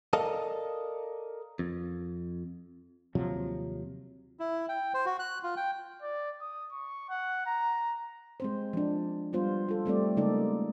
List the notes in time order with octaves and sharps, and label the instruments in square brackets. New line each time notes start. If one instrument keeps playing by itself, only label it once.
[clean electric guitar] A4 A#4 D5 D#5 F5 A5
F2
[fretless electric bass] D#2 C3 F3 F#3
[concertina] E4
G5
C5
F#4
F#6
F4
G5
[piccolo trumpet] D5
D#6
C#6
F#5
A#5
[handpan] G#3 C4 C5
F3 D4
G3 B3 F4 C5
F4 A4
G3 A3 C4 D5
C#3 G#3 A#3 D#4 A4 D5